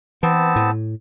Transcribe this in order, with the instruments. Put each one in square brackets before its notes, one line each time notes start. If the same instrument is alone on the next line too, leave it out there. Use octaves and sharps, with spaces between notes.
[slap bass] E3 [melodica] B3 C4 A5
[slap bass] A2